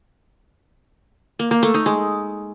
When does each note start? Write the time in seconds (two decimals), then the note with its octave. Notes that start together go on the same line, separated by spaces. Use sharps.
1.39 A#3
1.51 A#3
1.63 A3
1.74 D#4
1.86 G#3